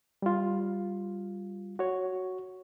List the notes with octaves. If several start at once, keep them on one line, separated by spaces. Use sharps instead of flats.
G3 F4
F#4 C#5